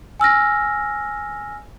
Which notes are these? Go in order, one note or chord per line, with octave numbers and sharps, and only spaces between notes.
G#5 E6 F6 A#6